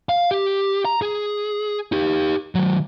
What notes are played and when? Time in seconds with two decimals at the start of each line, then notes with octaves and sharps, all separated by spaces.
0.09 F5
0.31 G4
0.85 A#5
1.02 G#4
1.92 D#4 G4
2.55 D#3 F#3